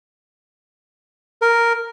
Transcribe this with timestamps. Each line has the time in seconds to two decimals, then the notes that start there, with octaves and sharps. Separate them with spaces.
1.42 A#4